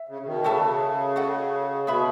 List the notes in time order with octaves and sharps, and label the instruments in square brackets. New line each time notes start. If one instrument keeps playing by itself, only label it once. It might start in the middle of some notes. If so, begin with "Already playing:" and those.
Already playing: [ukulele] E5
[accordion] C#3
C#3
B2 D#3
[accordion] C#3 [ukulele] F#4 A4 E5 A5
[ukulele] F#4 A4 D#5 F#5
[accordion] B2 [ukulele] G#4 B4 E5 B5